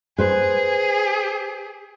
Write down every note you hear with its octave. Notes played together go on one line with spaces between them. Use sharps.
G#4 B4 C5